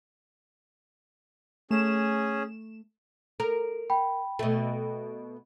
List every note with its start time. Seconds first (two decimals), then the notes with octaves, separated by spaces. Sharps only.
1.71 A3 C#4 G#4 E7
3.40 A4 A#4
3.90 G5 B5
4.39 B2 A3